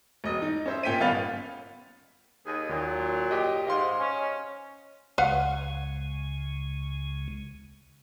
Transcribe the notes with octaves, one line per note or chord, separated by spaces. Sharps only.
E1 D#5
D#4
C#4 C5 E5
A#2 C#4 G5 B6 D#7
G1 B3 F5 B5 A6 F7
D#2 G#4 D#5
D#2 A#2 F#3
G4 D#5
G#2 D#5 F5 C6
C#4
C#2 C#3 G#3 B4 F5 F#5